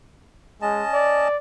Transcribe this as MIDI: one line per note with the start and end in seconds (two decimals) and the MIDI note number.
0.62 0.83 56
0.62 1.28 61
0.62 1.28 75
0.62 1.28 81
0.93 1.37 74